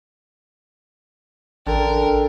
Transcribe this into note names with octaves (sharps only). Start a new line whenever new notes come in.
A1 D3 A#4 G5